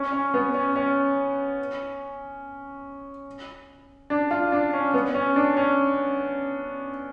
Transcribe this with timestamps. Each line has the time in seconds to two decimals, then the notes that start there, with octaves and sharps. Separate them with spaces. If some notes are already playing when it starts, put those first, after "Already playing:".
Already playing: C#4
0.12 C#4
0.34 B3
0.54 C#4
0.76 C#4
4.10 D4
4.31 F4
4.52 D4
4.73 C#4
4.94 B3
5.14 C#4
5.36 D4
5.57 C#4